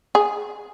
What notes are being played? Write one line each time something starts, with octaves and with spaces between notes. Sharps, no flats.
G#4